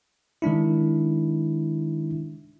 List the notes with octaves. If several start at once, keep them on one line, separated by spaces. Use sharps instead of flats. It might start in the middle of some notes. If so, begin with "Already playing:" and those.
D#3 G#3 D4 E4